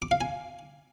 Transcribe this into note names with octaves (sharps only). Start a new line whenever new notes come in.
D6
F5
G#5